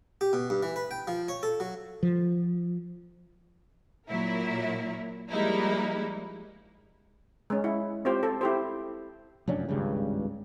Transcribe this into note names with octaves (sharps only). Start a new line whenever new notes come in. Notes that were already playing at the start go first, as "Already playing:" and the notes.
G4
B2
G2
E3
B4
G5
F3
C#5
A4
F#3
F3
A#2 F#3 E4 A#4
F3 G3 G#3 A#3 D#4 E4
G#3 C#4
E4
C4 F4 G4 C5
A4
E4 G4 C5
F1 F#2 C#4 D4
G#1 C#2 G2 C#3